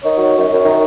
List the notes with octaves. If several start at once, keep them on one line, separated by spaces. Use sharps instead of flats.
D#3 C#5
F#3
F#2
F#2
D#3